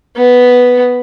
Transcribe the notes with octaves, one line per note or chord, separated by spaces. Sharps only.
B3